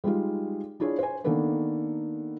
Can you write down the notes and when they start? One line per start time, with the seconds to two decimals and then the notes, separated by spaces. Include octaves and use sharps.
0.04 G3 G#3 D#4 F4
0.80 D4 E4 F4 G#4 C#5
0.98 C5 G#5
1.24 D#3 A#3 B3 D4 A4 B4